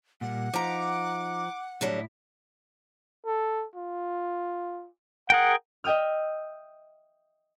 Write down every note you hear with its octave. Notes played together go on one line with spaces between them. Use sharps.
A#2 G3 A#3 F#5
F3 D#4 A#5 D6
A2 D3 F#3 G3 E4
A4
F4
G#4 A#4 F#5 G5
D#5 E5 G5 D#6 F6